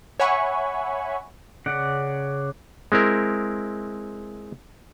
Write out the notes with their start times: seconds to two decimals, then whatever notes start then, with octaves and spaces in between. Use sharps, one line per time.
0.20 C#5 E5 F#5 G#5 B5 C#6
1.66 C#3 D5 F#5
2.92 G#3 C4 E4 A#4